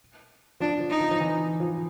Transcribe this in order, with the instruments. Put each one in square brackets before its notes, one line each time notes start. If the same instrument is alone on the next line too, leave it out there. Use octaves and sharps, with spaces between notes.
[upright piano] F3 [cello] D4
[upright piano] F3
[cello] D#4
[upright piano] F3
F3
E3
F3